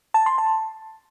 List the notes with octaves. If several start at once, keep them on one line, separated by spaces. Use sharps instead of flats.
A5
C6
A5